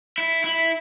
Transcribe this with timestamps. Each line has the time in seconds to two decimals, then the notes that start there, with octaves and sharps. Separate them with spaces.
0.18 E4
0.44 E4